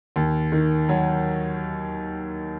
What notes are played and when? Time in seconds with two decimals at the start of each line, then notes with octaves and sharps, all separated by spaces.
0.16 D#2
0.52 D#3
0.89 F#3